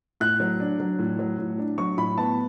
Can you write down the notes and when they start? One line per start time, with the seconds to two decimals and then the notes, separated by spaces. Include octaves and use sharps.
0.20 A2 F#6
0.40 F#3
0.60 D4
0.80 F#3
0.99 A2
1.19 F#3
1.39 A2
1.58 D4
1.78 F#3 C#6
1.97 A2 B5
2.18 B3 A5